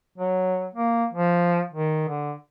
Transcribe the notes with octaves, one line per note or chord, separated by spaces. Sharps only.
F#3
A#3
F3
D#3
D3